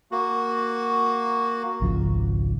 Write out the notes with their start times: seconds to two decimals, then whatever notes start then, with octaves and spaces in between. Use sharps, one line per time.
0.12 A#3 F#4
1.81 G#1 C#2 F3